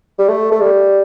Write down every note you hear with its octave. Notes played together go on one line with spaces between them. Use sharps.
G3
A3
A3
G3